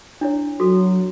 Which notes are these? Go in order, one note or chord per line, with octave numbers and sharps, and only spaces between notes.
D4 E4 C#5
F#3 F#4 A4